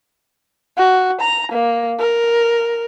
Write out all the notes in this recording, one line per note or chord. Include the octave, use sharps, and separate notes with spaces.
F#4
A#5
A#3
A#4